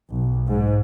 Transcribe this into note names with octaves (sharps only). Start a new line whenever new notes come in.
B1
G#2